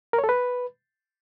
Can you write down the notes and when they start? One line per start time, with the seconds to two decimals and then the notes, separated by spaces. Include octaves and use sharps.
0.13 A#4
0.18 C#5
0.24 A4
0.29 B4